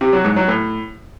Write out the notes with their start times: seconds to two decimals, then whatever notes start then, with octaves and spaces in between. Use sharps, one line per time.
0.01 C3
0.13 F#3
0.25 G#2
0.36 F#3
0.48 A2